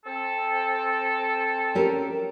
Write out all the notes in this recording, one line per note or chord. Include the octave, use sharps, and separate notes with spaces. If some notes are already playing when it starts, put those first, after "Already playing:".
C4 A4
C#4 G4 A#4